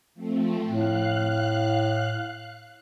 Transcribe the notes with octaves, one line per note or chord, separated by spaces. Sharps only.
F3 A3 C4
A2 F5 F#6